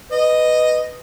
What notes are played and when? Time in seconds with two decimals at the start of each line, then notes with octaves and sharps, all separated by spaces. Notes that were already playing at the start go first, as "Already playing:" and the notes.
0.12 B4 D#5